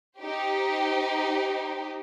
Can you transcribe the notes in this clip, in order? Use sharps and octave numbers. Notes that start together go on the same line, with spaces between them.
D#4 G4 C5